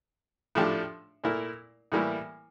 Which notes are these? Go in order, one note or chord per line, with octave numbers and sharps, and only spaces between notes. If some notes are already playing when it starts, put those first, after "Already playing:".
A2 F3 A3 D4 G4
A#2 A3 E4 A#4
A2 E3 G3 A#3 E4